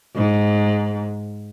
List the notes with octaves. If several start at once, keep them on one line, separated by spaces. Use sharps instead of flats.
G#2